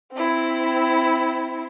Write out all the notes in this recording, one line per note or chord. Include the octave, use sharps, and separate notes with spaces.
C4 E4